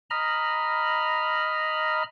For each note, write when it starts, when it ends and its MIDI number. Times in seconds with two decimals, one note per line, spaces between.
0.10 2.03 75
0.10 2.03 82
0.10 2.03 83
0.10 2.03 89